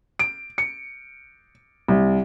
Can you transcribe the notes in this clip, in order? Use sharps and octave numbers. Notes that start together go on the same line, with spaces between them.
D7
C#7
C2